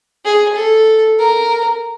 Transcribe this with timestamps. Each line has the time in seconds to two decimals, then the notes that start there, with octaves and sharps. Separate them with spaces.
0.25 G#4
0.55 A4
1.19 A#4